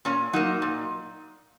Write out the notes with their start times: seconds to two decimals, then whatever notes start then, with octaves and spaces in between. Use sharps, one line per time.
0.05 A#2 C#4
0.33 F#3 A#3 D#4
0.62 A#2